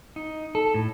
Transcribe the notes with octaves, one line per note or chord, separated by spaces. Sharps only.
D#4
A4
A2